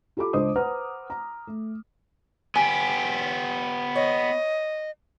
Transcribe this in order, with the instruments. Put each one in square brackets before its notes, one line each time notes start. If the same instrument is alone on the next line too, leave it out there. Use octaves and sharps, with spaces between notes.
[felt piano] F4 G4 A4 B5 D6
C#2 D4 C5 D#5 D#6
B4 C5 F#5 A#5 F6
A#5
A3
[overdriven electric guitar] B3 G4 [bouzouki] G#5
[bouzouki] C#5 [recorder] D#5